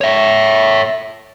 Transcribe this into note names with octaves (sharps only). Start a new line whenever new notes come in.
C#5 E5